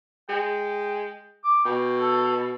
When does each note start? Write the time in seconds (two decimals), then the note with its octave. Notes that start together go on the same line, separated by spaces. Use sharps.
0.29 G#3 G5
1.44 D6
1.65 B2 G5
1.98 A4